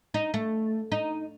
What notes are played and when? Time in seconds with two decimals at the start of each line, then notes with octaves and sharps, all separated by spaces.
0.14 D#4
0.34 A3
0.92 D#4